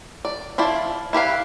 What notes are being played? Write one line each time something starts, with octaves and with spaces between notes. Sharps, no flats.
D5
F3 E4 F4 D5
E4 G4 B4 F5